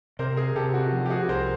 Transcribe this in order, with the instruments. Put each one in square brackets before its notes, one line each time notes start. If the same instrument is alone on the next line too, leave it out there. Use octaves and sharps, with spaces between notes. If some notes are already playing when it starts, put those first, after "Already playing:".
[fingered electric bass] C3 [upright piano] A#4 C5
[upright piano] G#4 A#4
[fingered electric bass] C3 [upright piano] G4 A4
[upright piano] F#4
[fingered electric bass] F3
[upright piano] G4
F#4 G#4
[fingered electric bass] C2 [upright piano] A#4 C5